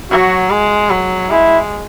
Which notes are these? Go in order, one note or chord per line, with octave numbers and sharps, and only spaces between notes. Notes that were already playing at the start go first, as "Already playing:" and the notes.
F#3 F#4
G#3
F#3
G#3 E4